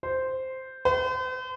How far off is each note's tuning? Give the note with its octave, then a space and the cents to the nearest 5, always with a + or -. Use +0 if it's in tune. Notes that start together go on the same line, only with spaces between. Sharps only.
C5 -5
C5 -45